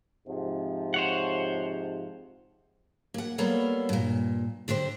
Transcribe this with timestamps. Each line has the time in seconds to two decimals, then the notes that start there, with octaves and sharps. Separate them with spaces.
0.28 G#2 C3 F3
0.94 C5 C#5 F#5
3.14 A#3 F#5
3.38 G3 A#3 B3 A4 C#5 F5
3.89 G2 A#2
4.68 D3 D4 G4 C5